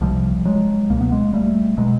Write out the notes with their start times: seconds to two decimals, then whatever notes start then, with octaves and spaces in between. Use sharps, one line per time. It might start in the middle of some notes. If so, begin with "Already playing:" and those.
0.01 C2 C3 F3 G3
0.45 F#3 G#3
0.90 C#2 B2 A#3
1.01 B3
1.12 G#3 A#3
1.33 G3 A3
1.77 B2 F#3 G#3